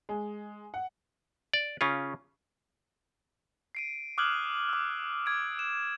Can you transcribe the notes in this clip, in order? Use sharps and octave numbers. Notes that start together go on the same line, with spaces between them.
G#3
F#5
D5
C#3 C#4 F4
C7 D7 D#7
D6 D#6 F6 F#6 G#6 F#7
D6 E6
D6 G#6 D7
E7